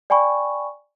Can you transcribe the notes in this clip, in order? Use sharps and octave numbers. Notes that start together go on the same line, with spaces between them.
D5 G5 G#5 B5 C#6